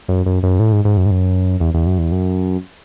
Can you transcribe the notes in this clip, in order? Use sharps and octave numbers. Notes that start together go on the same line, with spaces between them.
F#2
F#2
F#2
A2
G#2
G#2
F#2
G#2
F#2
E2
E2
F#2
E2
F#2